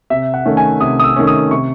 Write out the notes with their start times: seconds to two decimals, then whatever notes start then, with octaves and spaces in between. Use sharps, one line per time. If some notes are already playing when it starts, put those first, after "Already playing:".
0.10 C3 E5
0.34 F#5
0.45 D#3 A3 C#4
0.57 G#5
0.81 C3 D#6
1.00 D#6
1.04 E6
1.16 D#3 A3 C#4
1.27 D#6
1.51 C3 C#6